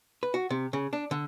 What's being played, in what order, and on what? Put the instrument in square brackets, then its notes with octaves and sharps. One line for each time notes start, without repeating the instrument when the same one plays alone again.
[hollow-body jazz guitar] B4
F#4
C3
C#3
D4
D3